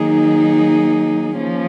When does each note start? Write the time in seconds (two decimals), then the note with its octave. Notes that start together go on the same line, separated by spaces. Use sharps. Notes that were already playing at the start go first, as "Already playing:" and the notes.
Already playing: D#3 F#3 A#3 D#4 G#4
1.38 F3 A#3 C#4